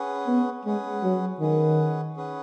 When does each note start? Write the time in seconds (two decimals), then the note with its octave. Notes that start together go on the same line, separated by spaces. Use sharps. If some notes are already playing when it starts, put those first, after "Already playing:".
Already playing: C#4 G#4 B4 F#5
0.27 B3
0.65 G#3 C#4 G#4 B4 F#5
1.03 F#3
1.40 D#3 C#4 G#4 B4 F#5
2.16 C#4 G#4 B4 F#5